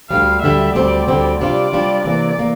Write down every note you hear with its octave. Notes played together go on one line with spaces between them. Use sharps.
D2 D3 G3 F5
D2 D3 G3 E5
D2 D3 G3 C4 D5
D2 D3 G3 C4
C3 G3 D4 F4 D5
C3 G3 D4 F4
C3 E3 A#3 D5
C3 E3 A#3